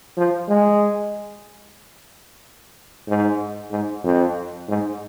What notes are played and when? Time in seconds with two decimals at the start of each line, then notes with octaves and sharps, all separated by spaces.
0.17 F3
0.49 G#3
3.08 G#2
3.72 G#2
4.04 F2
4.69 G#2